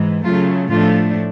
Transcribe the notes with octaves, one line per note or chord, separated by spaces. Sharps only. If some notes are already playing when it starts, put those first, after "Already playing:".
Already playing: G#2 E3 G#3
C#3 F#3 A3 F4
A2 F3 A3 D4 F4